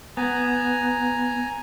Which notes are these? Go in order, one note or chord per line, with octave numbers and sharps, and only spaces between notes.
B3 G#5 A#5